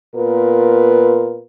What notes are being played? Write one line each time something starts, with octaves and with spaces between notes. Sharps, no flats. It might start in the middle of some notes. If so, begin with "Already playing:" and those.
A#2 B3 F4 A#4 B4